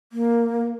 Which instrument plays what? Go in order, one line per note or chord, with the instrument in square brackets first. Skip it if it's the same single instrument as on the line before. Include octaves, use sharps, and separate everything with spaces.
[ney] A#3